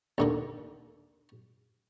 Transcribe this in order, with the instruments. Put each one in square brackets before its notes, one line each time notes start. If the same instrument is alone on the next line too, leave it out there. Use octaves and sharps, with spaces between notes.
[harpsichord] D#2 D3 A#3